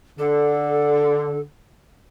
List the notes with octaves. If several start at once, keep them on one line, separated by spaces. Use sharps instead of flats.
D3 A4